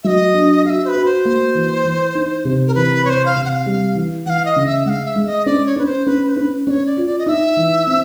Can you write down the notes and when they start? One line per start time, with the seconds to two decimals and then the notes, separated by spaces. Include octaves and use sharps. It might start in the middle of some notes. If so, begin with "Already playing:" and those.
0.04 F#3 D#5 E5
0.34 D4
0.64 F#4 F5
0.70 E5
0.85 C5
0.88 B4
0.95 F#4
1.05 C5
1.25 A#3
1.55 E3
1.85 E3
2.15 D#4
2.45 C3
2.67 A#4
2.75 E3 B4
3.05 C3 C5 C#5
3.25 F5
3.36 C3
3.45 F#5
3.49 F5
3.66 G3
3.95 E3
4.26 E3 F#5
4.30 F5
4.45 D#5
4.56 C#3
4.66 E5
4.85 G#3 F#5
4.90 F5
5.06 E5
5.16 G#3
5.27 D#5
5.46 C#4 D5
5.66 C#5
5.76 C#4 B4
5.86 C5
6.06 C#4 B4
6.27 C5
6.31 B4
6.37 C#4
6.67 C#4 D5
6.71 C#5
6.86 D5
6.97 F4
7.06 D5
7.19 D#5
7.26 D#4 E5
7.57 E3
7.87 C4